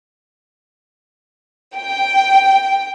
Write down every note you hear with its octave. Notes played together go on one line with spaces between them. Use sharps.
G5